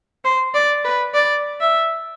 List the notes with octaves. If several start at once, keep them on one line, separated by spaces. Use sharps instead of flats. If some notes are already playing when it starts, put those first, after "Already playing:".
C5
D5
B4
D5
E5